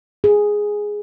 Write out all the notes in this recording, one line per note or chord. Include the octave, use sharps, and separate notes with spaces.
G#4